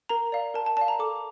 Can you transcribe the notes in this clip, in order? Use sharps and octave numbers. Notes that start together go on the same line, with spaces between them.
A#4 A#5
D5 F5
A#4 A5
A5
D5 F5 A5
A#5
A4 D6